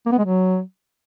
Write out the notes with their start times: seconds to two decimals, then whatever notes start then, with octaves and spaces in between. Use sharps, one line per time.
0.06 A#3
0.12 B3
0.18 G#3
0.24 F#3